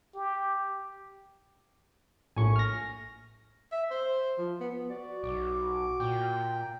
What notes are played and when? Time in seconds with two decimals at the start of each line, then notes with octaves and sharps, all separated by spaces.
0.15 G4
2.37 A#1 A2 G#5 C#6
2.56 F6 A#6
3.72 E5
3.91 C5
4.38 F3
4.60 B3
4.90 F#4 D5
5.23 B1 D6
6.00 A#2 G5